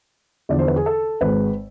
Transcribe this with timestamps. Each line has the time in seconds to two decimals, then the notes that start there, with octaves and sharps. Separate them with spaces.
0.49 E2 D3 F3 D5
0.59 C5
0.68 B4
0.76 G#4
0.86 A4
1.21 G#1 G#2 G#3 B4